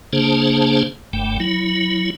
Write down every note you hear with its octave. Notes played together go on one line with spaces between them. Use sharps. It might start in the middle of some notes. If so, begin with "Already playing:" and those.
C#3 A#3 D4 G#4 C5 A5
F#1 G2 A3 G5
F#3 E4